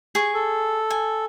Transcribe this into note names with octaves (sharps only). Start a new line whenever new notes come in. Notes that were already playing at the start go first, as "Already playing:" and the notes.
G#4 C#6
A4
G#5